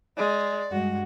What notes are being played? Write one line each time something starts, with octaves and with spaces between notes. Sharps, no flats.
G#3 D5
G2 G#3 F#4